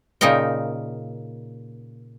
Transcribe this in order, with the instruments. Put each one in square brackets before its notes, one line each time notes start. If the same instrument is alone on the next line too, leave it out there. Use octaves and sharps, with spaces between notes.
[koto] A#2 C#3 D#4 A#4 G5